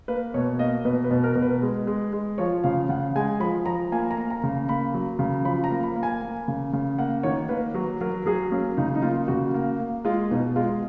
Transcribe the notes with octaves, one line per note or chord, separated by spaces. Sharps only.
A#3 B4
B2 C#5
A#3 D#5
B2 B4
B4
B2
A#4
B2
B4
G#3
G#3
G#3
F3 C#5
C#3 F5
C#3 F#5
G#3 G#5
F3 B5
F3 A#5
A#3 G#5
A#5
A#3
A#5
C#3
A#3 B5
F#3
C#3
F3 B5
A#5
A#3
B5
A#3
G#5
A#3
C#3
C#3
A#3 F#5
D#3 C#5
A#3 B4
F#3 F#4
F#3 A#4
F#3 G#4
A#3 C#4
C#3 D#4
D#4
A#3 F4
C#3 F#4
A#3
A#3
G#3 F4
B2 D#4
G#3 F4